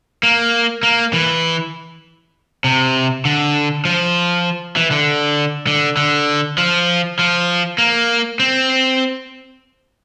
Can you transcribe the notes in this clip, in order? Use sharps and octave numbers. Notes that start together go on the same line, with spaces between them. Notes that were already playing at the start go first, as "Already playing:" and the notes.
A#3
A#3
E3
C3
D3
F3
E3
D3
D3
D3
F3
F3
A#3
C4